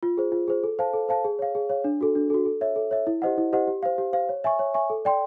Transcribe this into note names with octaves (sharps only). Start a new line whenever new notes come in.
F4
G#4 C5
F4
G#4 C5
A4
C5 F5 A5
A4
C5 F5 A5
G#4
C#5 F5
G#4
C#5 F5
D4
F#4 A4
D4
F#4 A4
A4
C#5 E5
A4
C#5 E5
E4
G4 C5 D#5 F#5
E4
G4 C5 D#5 F#5
G4
C5 F5
G4
C5 F5
C#5
E5 G#5 C#6
C#5
E5 G#5 C#6
A4
D5 G5 C6